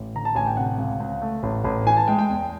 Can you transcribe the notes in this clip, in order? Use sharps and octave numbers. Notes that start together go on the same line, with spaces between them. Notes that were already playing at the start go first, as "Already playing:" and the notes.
Already playing: A1
D3 A#5
A5
A1 G#5
G5
C3 F#5
C#2
C#2
A3
A1
A1
E3 G#5
A5
G#3 G5
G5
E2